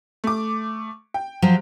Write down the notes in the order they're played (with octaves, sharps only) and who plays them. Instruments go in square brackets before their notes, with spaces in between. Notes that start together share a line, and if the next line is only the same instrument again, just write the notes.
[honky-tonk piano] A3 D6
G5
[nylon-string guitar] F3 F#3